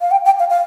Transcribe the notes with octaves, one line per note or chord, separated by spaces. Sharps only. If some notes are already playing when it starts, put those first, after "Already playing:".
F5
G5
G5
F5
F5